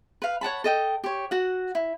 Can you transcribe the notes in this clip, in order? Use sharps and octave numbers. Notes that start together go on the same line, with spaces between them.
B4 F5
C#5 F#5 A5 B5
A4 D#5 G5
G4 C#5
F#4 F#5
E4